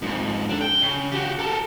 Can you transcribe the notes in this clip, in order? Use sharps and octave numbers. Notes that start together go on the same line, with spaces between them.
F2 G#2
D4 A4
G5
C#3
F#4 G4
A4 A#4